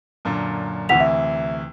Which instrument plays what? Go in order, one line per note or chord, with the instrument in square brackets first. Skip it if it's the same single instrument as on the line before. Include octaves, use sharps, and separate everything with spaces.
[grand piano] F#2 A#2 D3
[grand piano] D2 C3 E3 [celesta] F#5 B6 F7
[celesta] E5